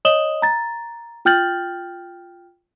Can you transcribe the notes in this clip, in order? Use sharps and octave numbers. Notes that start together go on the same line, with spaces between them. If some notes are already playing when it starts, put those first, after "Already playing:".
C#5 D#5 D#6 E7 F#7 G7
A#5 A6
F4 G5 F6 G6 A6 F#7